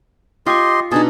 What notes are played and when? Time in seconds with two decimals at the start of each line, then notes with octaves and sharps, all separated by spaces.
0.46 F4 G4 D#5 C6 C#6
0.92 B2 D4 D#4 G#4 A5